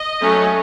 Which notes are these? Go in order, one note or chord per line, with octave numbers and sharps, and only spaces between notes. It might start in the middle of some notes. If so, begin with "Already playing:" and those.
Already playing: D#5
F#3 A3 C#4